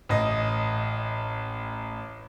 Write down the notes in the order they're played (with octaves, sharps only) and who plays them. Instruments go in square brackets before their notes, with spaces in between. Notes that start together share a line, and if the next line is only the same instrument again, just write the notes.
[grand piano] A1 D#5